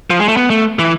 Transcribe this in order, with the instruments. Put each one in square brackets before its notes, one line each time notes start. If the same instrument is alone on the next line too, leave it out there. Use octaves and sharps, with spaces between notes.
[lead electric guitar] F3
G#3
A3
B3
A3
E3